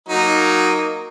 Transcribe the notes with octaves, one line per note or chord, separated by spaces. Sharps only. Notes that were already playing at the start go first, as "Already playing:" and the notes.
F#3 A#3 D#4